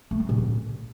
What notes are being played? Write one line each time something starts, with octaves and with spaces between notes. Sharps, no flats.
A3
C4
A#2
D3